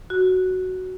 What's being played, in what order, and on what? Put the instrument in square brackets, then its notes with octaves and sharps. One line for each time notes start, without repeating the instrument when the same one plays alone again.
[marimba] F#4